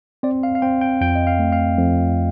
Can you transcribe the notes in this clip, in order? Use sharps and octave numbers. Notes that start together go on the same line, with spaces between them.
C4 D5
F5
F5
C4 G5
G5
F2 G5
D#5
F5
A3
F5
F2